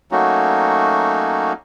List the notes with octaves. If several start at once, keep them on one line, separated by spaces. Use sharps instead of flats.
F#3 A3 A#3 C#4 D#4 F#4